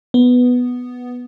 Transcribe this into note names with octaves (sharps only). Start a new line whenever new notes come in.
B3